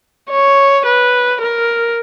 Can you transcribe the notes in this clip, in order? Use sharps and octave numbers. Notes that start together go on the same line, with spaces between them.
C#5
B4
A#4